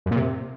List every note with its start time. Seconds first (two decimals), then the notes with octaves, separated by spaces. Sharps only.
0.06 F#2
0.11 A#2
0.16 C3